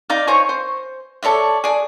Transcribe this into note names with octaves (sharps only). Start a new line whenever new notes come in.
D#4 D5 F5
C5 C#5 G#5 C#6
C5
A4 C#5 D5 E5
G#4 D5